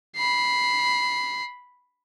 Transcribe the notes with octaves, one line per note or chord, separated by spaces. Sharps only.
B5 C7